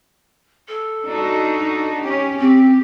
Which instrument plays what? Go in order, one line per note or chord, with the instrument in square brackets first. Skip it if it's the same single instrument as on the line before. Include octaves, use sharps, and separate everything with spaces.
[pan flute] A4
[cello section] D4 D#4 F#4
C#4 G4
[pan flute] C4 [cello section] G4